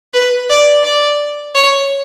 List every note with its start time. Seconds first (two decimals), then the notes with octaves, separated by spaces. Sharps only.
0.14 B4
0.50 D5
0.84 D5
1.55 C#5